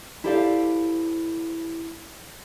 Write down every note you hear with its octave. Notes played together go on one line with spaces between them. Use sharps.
E4 G4 A4 C5 D5 F5